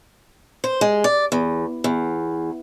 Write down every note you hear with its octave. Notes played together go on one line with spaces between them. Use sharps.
C5
G#3
D5
E2
E2